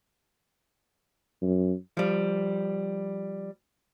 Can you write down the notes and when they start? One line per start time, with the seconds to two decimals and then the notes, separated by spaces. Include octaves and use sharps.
1.42 F#2
1.97 F3 G3